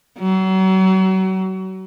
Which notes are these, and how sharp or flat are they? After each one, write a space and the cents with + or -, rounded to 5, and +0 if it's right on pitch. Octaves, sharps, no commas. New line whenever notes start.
F#3 +35